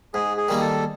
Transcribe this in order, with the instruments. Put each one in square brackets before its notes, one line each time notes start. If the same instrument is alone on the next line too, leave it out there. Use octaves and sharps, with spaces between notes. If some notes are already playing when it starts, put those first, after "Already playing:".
[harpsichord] G#2 [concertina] G#4
[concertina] G#4
[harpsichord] D#3 G3 A#3
[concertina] A4